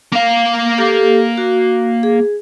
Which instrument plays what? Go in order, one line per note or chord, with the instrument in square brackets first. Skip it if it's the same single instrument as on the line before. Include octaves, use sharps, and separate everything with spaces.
[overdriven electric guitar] A#3 F5
[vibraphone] G4 A4
F#4
G#4